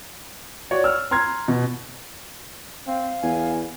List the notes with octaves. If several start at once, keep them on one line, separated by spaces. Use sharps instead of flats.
F#4 C#5 D5
E6 F6
A#5 C6 F6 G#6
B2
C4 F5
E2 G#5